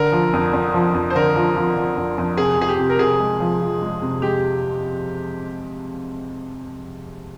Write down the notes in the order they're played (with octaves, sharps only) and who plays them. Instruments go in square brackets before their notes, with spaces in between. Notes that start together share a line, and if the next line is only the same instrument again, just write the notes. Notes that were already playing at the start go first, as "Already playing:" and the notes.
Already playing: [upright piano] D3 [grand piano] A#4
[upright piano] F3
F2
F2
F3
F2
[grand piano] C5
[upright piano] D3 [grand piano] A#4
[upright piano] F3
F3
F3
F2
F2
[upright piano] C3 [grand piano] G#4
[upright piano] C3 [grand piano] G#4
[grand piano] G4
[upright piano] C3
[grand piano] A#4
[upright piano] C3 [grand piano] G#4
[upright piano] G#3
F3
F3
G#3
C3
[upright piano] G#3 [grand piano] G4